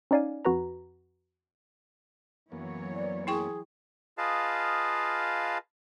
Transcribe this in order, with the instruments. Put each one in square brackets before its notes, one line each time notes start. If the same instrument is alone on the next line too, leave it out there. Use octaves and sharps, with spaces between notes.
[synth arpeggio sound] C#4 D#4 D5 F5 G#5
F2 F#4 B4 A#5
[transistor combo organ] F#2 A#3 B3 [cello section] E3 F#3 C#5
[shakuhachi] D5
[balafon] E4 G5 C#6 [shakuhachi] G#4
[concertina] F4 G#4 B4 D#5 F5 A5